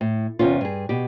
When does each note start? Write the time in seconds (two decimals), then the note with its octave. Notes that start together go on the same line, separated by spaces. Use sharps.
0.01 A2
0.39 E2 C3 C#4 F4
0.61 G2 G#4
0.89 B2 G4